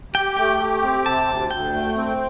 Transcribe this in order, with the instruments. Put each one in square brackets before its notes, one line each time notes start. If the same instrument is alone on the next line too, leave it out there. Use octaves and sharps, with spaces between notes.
[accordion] G4 [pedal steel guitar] G5
[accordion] A3 [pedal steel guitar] G5
[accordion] G4
C4
[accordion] C3 [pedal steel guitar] A5
[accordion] D2
[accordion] D2 [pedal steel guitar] G5
[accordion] A3
C4